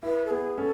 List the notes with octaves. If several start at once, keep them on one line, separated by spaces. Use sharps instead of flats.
E4 B4
A4
B3 G#4
C#4 A4